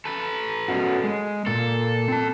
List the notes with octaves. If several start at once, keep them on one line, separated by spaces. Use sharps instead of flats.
A4 B4
B3 C#4 F#4
G#3
A#2 A#3 A4
C4 A5